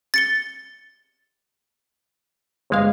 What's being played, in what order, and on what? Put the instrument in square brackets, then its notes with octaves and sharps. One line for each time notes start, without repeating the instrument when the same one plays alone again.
[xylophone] A6 C#7 G7
[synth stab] G1 G#3 F5